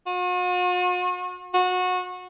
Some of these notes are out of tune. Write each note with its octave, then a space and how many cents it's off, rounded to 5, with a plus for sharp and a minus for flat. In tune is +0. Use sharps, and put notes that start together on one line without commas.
F#4 -45
F#4 -25